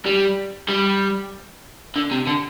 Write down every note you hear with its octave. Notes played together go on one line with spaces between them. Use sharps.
G3
G3
D3
C3
D3